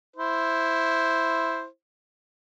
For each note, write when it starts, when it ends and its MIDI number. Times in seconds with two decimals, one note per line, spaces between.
0.16 1.65 64
0.16 1.65 72